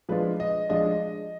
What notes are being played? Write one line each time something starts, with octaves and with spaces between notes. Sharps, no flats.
F3 G#3 D4 F4 B4
D#5
F3 G#3 D4 F4 D#5